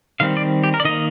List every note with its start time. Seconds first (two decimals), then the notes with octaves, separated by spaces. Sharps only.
0.20 D#3 G3 C4 F5
0.37 D5
0.64 G4
0.74 A#4
0.80 D5
0.85 D#3 A#3 D#5